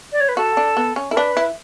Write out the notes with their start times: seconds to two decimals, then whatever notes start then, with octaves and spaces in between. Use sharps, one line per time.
0.12 D5
0.21 C#5
0.29 B4
0.37 F#4 A4
0.57 D4
0.77 B3
0.96 C#4
1.11 E4 A4
1.16 D4 B4
1.37 E4